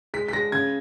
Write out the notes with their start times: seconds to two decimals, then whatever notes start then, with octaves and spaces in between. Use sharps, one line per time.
0.14 G#3 B6
0.28 B6
0.33 G#3 A#6
0.52 C#3 G#6